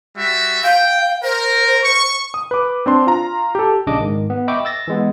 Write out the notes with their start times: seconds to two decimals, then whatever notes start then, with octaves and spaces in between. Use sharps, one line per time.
0.16 G3 F#4 E5
0.64 F5 G5
1.23 A#4 C5
1.83 C#6
2.34 D#6
2.51 B4 D6
2.86 C4 D4 C6
3.07 F4 A#5
3.55 G4 A4
3.87 A#1 C#3 D4 D#5 D6
4.00 G#2 D#3
4.30 B3
4.48 D#5 E5 G5 B5 C#6 D6
4.65 E6 A6 A#6
4.88 E3 G#3 B3